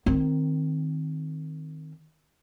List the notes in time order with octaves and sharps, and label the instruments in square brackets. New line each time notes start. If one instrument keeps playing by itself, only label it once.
[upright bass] D#3 C4